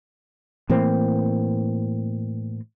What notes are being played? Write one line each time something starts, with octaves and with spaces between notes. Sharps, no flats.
A2 E3 A#3 C4